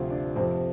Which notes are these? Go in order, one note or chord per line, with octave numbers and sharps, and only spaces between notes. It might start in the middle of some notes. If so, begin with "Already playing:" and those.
Already playing: D2 C3 F3 F4
D4
F2 C3 F3 C4